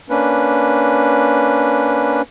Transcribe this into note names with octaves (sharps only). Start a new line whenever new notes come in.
A#3 C#4 D4 B4